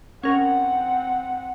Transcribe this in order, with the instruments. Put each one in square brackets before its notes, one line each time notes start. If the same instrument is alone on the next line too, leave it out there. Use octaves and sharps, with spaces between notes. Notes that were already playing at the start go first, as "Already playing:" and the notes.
[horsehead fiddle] C4 F#5 [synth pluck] C#4 A#4